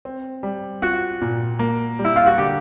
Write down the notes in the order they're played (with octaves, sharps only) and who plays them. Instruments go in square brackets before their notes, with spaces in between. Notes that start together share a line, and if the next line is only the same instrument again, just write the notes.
[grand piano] C4
G3
[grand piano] F4 [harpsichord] F#4
[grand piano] A#2
A#3
G3
[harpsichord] E4
F4
F#4
[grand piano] D3 [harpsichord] G4